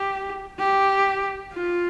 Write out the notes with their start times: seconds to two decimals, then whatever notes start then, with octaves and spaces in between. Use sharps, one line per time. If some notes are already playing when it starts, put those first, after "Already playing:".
Already playing: G4
0.60 G4
1.54 F4